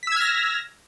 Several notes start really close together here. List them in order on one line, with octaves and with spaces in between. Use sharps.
B6 E6 G#6 F6 A#6